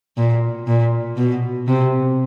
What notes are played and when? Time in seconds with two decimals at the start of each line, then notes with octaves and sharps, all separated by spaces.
0.17 A#2
0.67 A#2
1.17 B2
1.67 C3